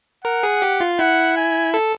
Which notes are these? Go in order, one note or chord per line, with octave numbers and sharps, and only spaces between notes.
A#4 F#5
G#4
G4
F4
E4 F#5
G#5
A4